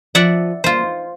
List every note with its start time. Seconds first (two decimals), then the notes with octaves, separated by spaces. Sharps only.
0.15 F3 D5 E5 F#5
0.64 G3 A#3 F4 B4 C5
0.83 D#4